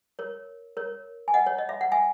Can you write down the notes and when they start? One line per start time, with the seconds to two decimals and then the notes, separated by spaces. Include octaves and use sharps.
0.19 A#4 C#5
0.77 A#4 C#5
1.28 G#5
1.34 D#5 F#5
1.47 C#5
1.58 D#5
1.69 E5
1.81 F#5
1.92 E5 G#5